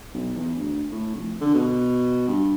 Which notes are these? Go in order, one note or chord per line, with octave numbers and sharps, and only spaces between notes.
B1
E2
D2
A2
F1
D3
B2
G2